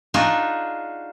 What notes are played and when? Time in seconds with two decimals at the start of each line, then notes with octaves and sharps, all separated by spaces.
0.14 D4 D#4 F4 F#4 G#4